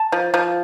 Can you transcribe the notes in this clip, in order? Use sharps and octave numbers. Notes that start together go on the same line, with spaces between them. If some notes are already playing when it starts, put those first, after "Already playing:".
Already playing: A5
F3
F3